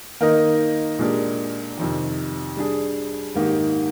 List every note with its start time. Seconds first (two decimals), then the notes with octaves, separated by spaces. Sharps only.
0.20 D#3 A#3 D#4 A#4 D#5
0.99 A#2 G#3 D4 G4 A#4
1.78 F2 C3 D#3
2.57 G3 D4 G#4
3.35 G#2 D#3 A#3 D#4 G4